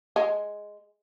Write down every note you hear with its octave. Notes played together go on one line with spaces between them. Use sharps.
G#3